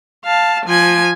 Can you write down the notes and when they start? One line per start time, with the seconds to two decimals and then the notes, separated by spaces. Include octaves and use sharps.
0.25 F5 A5
0.65 F3 G#5